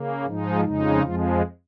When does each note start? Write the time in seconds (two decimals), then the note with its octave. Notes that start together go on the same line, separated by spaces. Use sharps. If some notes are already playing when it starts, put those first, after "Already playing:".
Already playing: C#3 A#3
0.25 G#2 F3 G#3 D#4
0.64 F2 C#3 G#3 D#4
1.03 F2 F3 G#3 F4